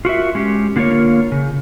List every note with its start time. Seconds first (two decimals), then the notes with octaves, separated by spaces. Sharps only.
0.05 F4 F#4 A#4 E5
0.35 G#3 C#4 G4
0.76 D3 A#3 F4 A#4 C#5
1.32 C#3